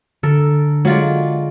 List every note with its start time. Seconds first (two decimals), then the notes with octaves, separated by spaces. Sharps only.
0.23 D3 A4 A#4
0.85 F#3 G#3 F4 D5